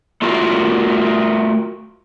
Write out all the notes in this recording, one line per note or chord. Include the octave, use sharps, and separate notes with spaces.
A3 F4 F#4 A#4